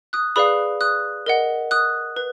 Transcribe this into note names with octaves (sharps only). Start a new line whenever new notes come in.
D#6 F#6
G#4 B4 D5 F5 B5 D#6
D#6 F#6
A#4 D#5 F#5
D#6 F#6
B4